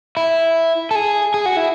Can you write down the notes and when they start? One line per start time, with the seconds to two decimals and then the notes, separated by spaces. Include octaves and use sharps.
0.17 E4
0.91 A4
0.95 G#4
1.34 G#4
1.46 F#4
1.57 E4